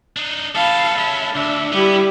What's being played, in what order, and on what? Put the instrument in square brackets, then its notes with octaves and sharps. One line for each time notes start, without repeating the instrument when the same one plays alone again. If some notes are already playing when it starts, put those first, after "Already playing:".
[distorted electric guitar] D4 D#4
[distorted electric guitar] B3 A4 [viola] F5 [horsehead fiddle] A5 B5
[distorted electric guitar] G#3 C#4 [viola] E5
[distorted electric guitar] D2 [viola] D4 [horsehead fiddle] E5
[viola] G3 E4 [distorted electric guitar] B3 [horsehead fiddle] G4